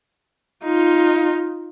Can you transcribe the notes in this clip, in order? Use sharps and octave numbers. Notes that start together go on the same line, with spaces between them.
D#4 F4